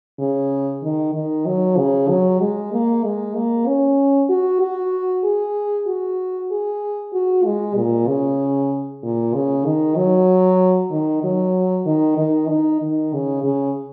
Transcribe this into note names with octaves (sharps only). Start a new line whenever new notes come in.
C#3
D#3
D#3
F#3
C#3
F#3
G#3
A#3
G#3
A#3
C#4
F#4
F#4
G#4
F#4
G#4
F#4
G#3
A#2
C#3
A#2
C#3
D#3
F#3
D#3
F#3
D#3
D#3
D#4
D#3
C#3
C#3